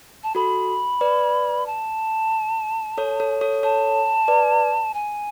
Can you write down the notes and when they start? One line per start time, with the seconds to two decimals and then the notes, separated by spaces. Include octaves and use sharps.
0.24 A5
0.35 F#4 A4 B5
1.01 B4 D5
1.66 A5
2.98 A4 C#5
3.20 A4 C#5
3.41 A4 C#5
3.63 A4 C#5 A5
4.28 B4 D5
4.94 G#5